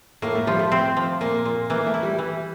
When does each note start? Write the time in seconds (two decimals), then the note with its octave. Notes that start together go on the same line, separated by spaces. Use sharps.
0.22 A2 A#3
0.35 A3
0.47 F3 G3
0.59 A3
0.72 C4
0.97 F3
1.21 A#2 A#3
1.45 A#2
1.70 E3 A#3
1.86 A3
1.94 E4
2.03 G3
2.19 E3